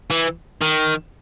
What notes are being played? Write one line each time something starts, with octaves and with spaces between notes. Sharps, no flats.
E3
D#3